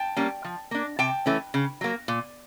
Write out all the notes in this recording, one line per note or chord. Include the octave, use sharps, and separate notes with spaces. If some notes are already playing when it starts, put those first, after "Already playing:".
Already playing: G5 A5
G3 A#3 C#4
F3
A#3 D4
C3 G5 A5
E3 A3 C#4
C#3
F#3 A#3
A#2